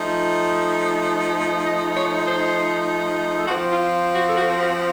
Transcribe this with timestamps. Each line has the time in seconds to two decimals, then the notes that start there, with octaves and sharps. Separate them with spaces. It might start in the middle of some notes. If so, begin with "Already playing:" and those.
Already playing: F3 A3 D#4
1.65 D#5
1.96 C#5
2.26 C5
3.38 A4
3.46 F3 C4 F4 F#4
3.70 F4
4.14 F#4
4.29 A4
4.37 F#4
4.60 F#4